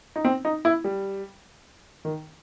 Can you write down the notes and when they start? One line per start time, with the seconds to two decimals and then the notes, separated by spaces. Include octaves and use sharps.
0.16 D#4
0.25 C4
0.45 D#4
0.65 E4
0.84 G3
2.05 D#3